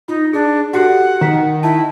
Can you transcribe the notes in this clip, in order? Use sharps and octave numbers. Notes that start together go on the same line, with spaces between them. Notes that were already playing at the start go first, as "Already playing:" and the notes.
D#4 F4
D4 G#4
F#4 G4 A4 F#5
D#3 A#5 B6
E4 A5